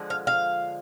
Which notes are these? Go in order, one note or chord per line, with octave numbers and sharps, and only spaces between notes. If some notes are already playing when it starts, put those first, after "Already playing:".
Already playing: D3 F3 G#3
F5
F5